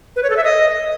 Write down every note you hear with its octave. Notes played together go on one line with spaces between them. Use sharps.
B4
C#5
A4
E5
D#5